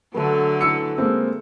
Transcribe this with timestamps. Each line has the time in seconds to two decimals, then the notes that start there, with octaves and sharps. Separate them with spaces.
0.14 D3 F#3 A3 B4
0.61 E3 E6 C#7
0.98 G#3 A#3 C4